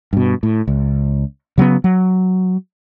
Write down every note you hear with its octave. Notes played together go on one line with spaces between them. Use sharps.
G2 B2
A2
C#2
C#3 F#3 G3 B3
F#3